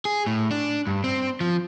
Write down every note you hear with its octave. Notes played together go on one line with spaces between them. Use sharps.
G#4
A2
D4
G2
C4
F3